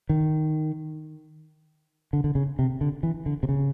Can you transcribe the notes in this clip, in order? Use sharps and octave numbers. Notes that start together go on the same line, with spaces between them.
D#3
D3
D3
C#3
C3
D3
E3
D3
C3
C#3